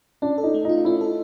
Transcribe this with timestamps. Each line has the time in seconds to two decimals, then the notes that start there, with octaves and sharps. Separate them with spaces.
0.22 C#4 D4
0.38 A4
0.43 D#4
0.54 A3
0.65 D#4 F4
0.85 C#4 E4
1.01 A4